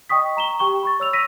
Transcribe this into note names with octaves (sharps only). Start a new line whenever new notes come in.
D#5 G5 C#6 D#6 B6
A#5 E7 G7
G4 G5 C#6 G7
B5 C#6 A6
C#5 E6 F7
E6 A#6 B6 D#7